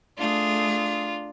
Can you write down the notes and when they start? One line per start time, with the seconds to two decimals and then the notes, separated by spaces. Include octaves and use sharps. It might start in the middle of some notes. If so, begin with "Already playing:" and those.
0.17 A3 D4 F4 G#4